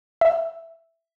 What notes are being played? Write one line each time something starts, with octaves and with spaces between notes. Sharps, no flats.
E5